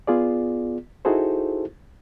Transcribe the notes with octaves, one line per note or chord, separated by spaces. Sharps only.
B3 F4 G#4 D5
D#4 E4 F#4 G#4 A4 C5